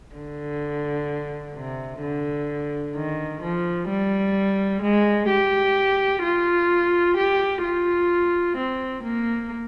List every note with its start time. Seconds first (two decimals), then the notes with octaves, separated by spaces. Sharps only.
0.15 D3
1.55 C3
2.02 D3
2.95 D#3
3.42 F3
3.89 G3
4.83 G#3
5.29 G4
6.23 F4
7.17 G4
7.64 F4
8.57 C4
9.03 A#3